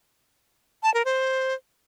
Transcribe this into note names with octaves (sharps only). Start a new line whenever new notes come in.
A5
A#4
C5